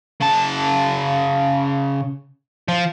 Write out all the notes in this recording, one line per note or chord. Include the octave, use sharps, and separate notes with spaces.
C#3 A5
F3